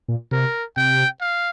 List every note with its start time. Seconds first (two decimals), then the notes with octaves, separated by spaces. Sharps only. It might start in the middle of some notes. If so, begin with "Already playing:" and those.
0.08 A#2
0.31 C3 A#4
0.77 C3 G5
1.21 F5